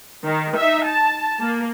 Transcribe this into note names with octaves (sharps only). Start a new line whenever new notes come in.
D#3
D#4 E5
A5
A#3